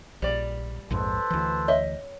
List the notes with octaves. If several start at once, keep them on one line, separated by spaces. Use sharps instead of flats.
A#1 G3 D5
A#1 F2 G#2 A4 B4 C5
D2 E3
C#5 D#5 E5